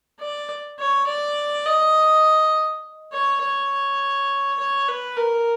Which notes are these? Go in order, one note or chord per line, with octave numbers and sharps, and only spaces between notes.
D5
C#5
D5
D#5
C#5
C#5
C#5
B4
A#4